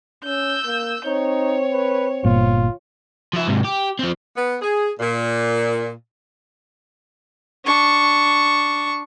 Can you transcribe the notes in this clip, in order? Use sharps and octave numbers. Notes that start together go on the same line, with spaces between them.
C#4 E6 G6
A#3
C4 D#4 C#5
B4
G1 A#2 F4
F3 E5
G#2 C3
G4
F3 C4
B3
G#4
A#2
D4 C#6